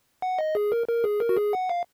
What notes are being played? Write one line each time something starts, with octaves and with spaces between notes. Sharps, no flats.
F#5
D#5
G#4
A#4
A#4
G#4
A#4
F#4
G#4
F#5
F5